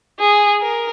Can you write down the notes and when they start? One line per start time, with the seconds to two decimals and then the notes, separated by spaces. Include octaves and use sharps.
0.20 G#4
0.62 A#4